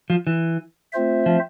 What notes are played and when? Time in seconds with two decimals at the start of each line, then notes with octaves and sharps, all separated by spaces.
0.10 F3
0.27 E3
0.93 A3 C4 F4 C5 E5
1.26 F3